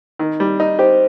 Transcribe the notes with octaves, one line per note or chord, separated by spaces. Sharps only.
D#3
G3
D#4
G4 C5